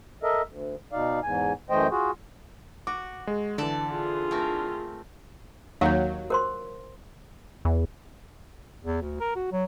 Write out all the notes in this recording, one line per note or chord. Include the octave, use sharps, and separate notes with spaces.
A4 A#4 D#5 E5
D2
B2 D#4 D5 F5
E2 G#2 G#5
F#2 E3 A3 C5 D#5 G5
F4 F#4 G#4
F#4 D6
G#3 G#4
D3 E3 A4 D5 A5
F4 G#4
A3 C4 A#4
D#2 F#3 C#5 F5
A#4 C5 C6
E2
E2
D2
A#4
F#4
F#3